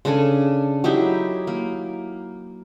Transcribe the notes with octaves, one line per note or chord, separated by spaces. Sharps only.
C#3 D4 A4 G#5
F#3 D#4 E4 G4
A#3